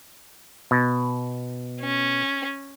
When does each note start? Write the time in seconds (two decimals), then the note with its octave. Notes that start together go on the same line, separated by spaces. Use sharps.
0.71 B2
1.81 C#4